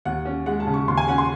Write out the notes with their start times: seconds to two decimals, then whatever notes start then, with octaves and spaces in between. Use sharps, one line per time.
0.05 D#2 F#5
0.26 C#4
0.46 G#3 F#5
0.60 A5
0.67 C#3
0.74 C#6
0.88 D#2 C6
0.97 G#5
1.08 C#4 F#5
1.18 C6